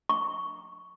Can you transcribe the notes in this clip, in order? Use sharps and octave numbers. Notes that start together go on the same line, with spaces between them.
C#6